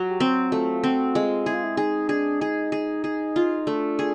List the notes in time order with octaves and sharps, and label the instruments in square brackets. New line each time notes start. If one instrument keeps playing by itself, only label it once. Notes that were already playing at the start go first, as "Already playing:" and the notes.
Already playing: [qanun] F#3
[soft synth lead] G4
[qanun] C4 [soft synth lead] F#4
[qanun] A3 [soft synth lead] F4
[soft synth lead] F4
[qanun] C4 [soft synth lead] F#4
[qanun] G#3 [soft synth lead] F4
[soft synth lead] E4 [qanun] G#4
[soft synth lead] F4
E4
[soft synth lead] D#4 [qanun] G#4
[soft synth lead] D4 [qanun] G#4
[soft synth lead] D#4 [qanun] G#4
[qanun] G#4
G#4
F4
[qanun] A3 [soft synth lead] D4
[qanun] G#4